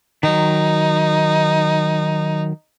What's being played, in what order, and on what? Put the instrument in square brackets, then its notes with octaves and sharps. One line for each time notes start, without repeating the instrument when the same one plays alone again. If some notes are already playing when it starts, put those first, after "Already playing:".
[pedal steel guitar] D#3 F#3 [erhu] D#4